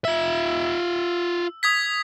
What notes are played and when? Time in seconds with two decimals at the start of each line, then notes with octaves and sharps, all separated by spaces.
0.05 F4 E5 E6
1.63 D#6 G#6 B6